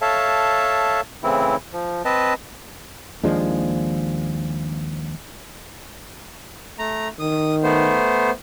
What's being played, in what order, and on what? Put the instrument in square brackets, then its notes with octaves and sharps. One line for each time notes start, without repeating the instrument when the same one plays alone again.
[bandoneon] A4 C#5 E5 F5 A5
A2 C#3 E3 C4 E4
F3
C4 B4 D#5 A5
[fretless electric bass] D#2 F3 G#3 D4
[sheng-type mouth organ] A3 A#5
[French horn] D#3 [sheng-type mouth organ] D#6
[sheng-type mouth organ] A3 B3 C5